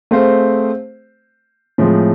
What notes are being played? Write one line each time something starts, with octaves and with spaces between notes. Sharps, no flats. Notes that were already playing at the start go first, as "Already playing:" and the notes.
A3 C4 G#4 C5 F5
A2 F3 G#3 C4